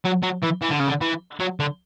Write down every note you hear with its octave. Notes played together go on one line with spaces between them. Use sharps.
F#3
F#3
E3
E3
D3
C#3
D3
E3
F#3
D3